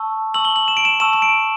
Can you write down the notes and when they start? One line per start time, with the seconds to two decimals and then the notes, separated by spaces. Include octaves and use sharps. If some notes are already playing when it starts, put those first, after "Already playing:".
Already playing: A5 C#6 E6
0.34 A5 C#6 E6 F#7
0.45 G7
0.56 F#7
0.68 E7
0.77 D7
0.85 E7
1.00 A5 C#6 E6 E7
1.13 E7
1.22 D7